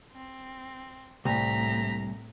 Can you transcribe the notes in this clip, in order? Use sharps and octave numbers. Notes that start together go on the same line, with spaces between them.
C4
C2 A2 A#5 B6